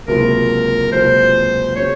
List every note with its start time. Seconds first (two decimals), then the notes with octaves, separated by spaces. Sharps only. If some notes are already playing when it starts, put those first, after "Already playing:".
0.08 C#2 C3 F#3 A#3 F4 A#4
0.92 C#2 C3 F#3 A#3 F4 C5
1.76 C#3 F#3 C#5